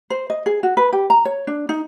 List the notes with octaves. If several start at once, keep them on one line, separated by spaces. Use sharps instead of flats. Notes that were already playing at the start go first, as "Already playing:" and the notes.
C5
D#5
G#4
F#4
B4
G4
A#5
C#5
D4
D#4